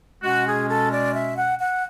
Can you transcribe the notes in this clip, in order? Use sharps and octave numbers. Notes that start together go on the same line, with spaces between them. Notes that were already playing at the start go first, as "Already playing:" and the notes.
B2 G#3 C#4 F#4
G#4
A4
D5
E5
F#5
F#5